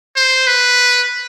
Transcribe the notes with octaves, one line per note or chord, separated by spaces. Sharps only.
C5
B4